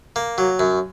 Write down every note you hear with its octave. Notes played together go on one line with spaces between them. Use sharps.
A#3
F#3
F#2